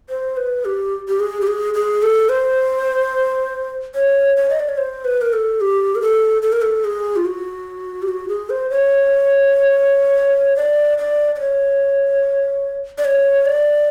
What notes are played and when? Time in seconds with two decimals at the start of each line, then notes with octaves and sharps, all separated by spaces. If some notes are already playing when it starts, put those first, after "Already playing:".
0.09 C5
0.37 B4
0.65 G4
1.08 G4
1.20 G#4
1.41 G4
1.47 G#4
1.74 G#4
2.03 A4
2.29 C5
3.95 C#5
4.37 C#5
4.50 D#5
4.60 D5
4.69 C#5
4.78 C5
5.05 B4
5.21 A#4
5.33 A4
5.61 G4
5.95 A#4
6.02 A4
6.42 A4
6.52 A#4
6.62 A4
6.84 G#4
7.16 F4
7.25 F#4
8.02 G4
8.08 F#4
8.28 G#4
8.50 C5
8.70 C#5
10.56 D5
10.98 D5
11.35 D5
11.40 C#5
12.98 D5
13.05 C#5
13.46 D5